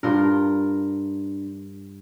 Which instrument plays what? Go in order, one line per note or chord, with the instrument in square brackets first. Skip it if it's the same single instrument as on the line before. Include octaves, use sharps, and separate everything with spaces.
[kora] G2 F4 A#4 [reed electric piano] D4